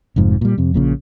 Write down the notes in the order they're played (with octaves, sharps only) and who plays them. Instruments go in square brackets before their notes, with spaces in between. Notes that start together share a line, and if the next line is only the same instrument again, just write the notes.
[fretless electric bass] F1 F2 G#2 F3
A#2 G3
F2 C3
A#1 A#2 C#3